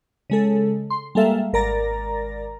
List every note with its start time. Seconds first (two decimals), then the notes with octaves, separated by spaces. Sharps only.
0.30 C#3 G#3 A4
0.90 C6
1.15 G3 G#3 A#3 A4 E5 F5
1.53 G#1 A#4 D5 A#5 A6 A#6